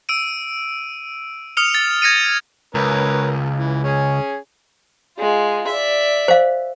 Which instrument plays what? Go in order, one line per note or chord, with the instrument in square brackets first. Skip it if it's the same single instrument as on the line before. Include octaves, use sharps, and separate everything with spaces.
[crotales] E6 D7 D#7
D#6 F6 C#7 F7
A6
G#6 A#6 C#7 D#7
[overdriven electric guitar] C#2 [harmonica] C#4 A#4 B4
[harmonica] E3
C#4 G#4
[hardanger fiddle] G#3 F4
D5 E5
[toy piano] C5 F5